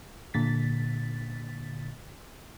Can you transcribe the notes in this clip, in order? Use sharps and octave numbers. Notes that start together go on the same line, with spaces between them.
A#2 D3 A6 B6